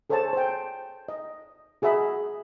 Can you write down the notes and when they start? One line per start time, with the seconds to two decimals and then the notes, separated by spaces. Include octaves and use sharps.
0.10 G#4 A4 C5 C#5 G#5 A5
0.33 C5 G5
1.09 D#5
1.82 F#4 G#4 D#5 E5 B5